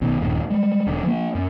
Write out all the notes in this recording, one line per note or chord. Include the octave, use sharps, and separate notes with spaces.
B1 B2 D#3
D#1 G2 A#2 D#3
G3 G#3
E1 D3
F3 A#3
F#2